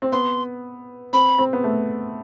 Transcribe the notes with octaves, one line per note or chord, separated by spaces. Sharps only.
C4
B3 C6
C4 B5
C4
B3
A3